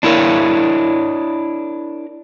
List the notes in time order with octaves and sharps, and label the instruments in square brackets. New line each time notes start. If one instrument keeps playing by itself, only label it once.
[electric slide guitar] D4 E4 A#4 C#5